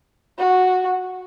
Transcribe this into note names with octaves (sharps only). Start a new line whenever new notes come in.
F#4